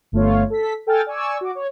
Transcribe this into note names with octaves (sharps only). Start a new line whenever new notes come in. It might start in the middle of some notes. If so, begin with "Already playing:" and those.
G1 A3 F4 C#5
A4 B6
A4 G5 G#5 F6 A6
D5 G#5 C#6 E6
F#4 D6
C#5